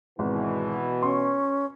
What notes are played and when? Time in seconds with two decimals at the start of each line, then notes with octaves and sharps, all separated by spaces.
0.19 G#1 B2 E3
1.03 C#4 C6 C#6